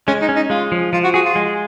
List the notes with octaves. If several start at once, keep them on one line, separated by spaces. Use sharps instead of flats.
G#3 C#4
D#4
C#4
D#4
G#3 F4
F3
F3 F4
F#4
F#4 G#4
F4
G#3